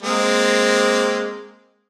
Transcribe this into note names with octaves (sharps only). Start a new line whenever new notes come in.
G#3 A#3 C4